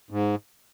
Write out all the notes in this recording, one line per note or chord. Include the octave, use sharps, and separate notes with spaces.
G#2